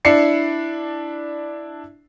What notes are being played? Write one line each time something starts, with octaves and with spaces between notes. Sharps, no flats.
D4 E4 D5 C7 C#7